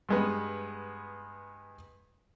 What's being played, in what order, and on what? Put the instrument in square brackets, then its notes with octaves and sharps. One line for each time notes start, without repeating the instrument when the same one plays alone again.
[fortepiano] G2 G#3 B3